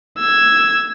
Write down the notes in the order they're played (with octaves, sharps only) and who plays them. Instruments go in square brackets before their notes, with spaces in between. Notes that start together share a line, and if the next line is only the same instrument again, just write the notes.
[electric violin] E6 G#6